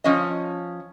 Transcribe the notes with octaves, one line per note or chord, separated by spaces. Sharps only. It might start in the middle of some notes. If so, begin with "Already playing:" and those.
F3 C#4 D#5